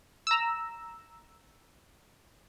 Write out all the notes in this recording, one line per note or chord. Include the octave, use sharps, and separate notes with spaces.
A#5 E6